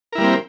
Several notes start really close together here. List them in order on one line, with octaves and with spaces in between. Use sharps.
A#4 E4 G3 A#3 C4